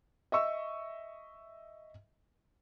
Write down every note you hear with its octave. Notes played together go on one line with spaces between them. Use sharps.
D#5 E5 C#6 E6